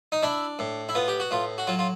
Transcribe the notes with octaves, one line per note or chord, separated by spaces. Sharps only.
D#4
D4 E4
A2
E4
B3 F4
G4
F#4
A2 F4
F#4
F#3 F4
F4